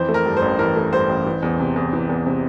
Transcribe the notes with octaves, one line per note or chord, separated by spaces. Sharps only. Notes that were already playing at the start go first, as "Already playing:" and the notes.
Already playing: F2 E3 C5
A3
A#4
G2
C5
A1
E3 A#4
A3
G2 C5
A1
E3
E2
C3
E2
E3
E2
C3